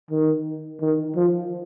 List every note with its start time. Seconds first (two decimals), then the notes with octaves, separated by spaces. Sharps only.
0.11 D#3
0.81 D#3
1.16 F3